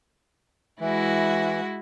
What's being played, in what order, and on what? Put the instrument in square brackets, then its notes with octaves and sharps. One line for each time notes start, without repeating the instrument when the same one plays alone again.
[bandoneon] E3 [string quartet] G#3 E4 F#4